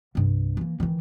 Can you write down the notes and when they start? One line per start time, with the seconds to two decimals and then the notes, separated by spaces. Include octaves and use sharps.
0.15 C2 G2
0.57 E3 A#3
0.80 D#3 E3